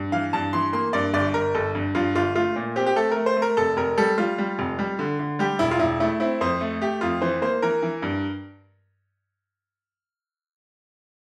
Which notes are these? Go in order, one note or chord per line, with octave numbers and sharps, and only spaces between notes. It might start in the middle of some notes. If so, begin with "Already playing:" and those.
Already playing: G2
E3 F5
G2 A5
E3 C6
A#3 C6
G2 D5
G1 D5
G1 A#4
G1 A4
G2
G2 F4
G1 F4
A3 F4
A#2
C4 G4
G4
A3 A4
A3 A#4
C5
A3
A#4
F1 A4
F1 A#4
G3 A4
G3 F4
G3
F1
G3
D3
D3
G3 G4
E1 E4
F4
E1 E4
A3 E4
C4 E4
F2 C5
A3
A3 G4
F2 F4
E3 C5
A#3 C5
E3 A#4
E3
G2